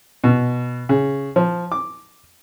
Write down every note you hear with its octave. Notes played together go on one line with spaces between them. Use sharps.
B2
C#3
F3
D6